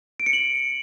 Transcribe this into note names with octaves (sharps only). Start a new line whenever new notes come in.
D7
C#7
F#7